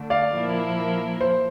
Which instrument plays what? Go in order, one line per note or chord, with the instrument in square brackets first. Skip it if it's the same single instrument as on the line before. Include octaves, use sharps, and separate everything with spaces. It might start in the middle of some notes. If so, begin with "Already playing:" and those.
Already playing: [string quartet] D3 A3 D4
[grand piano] D5 F5
[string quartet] A#2 F3 A#3 E4 A#4
[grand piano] C5